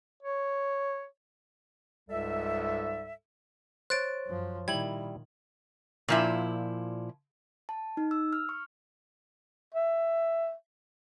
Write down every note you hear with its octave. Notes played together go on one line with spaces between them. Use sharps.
C#5
C#2 G#2 G3 A4 E5
C5 C#5 F#6 A6 D7
F#2 F3
A#2 D#3 G3 E4 G#6 F#7
A#2 F3 E4
A5
D#4
E6
F6
C#6
E5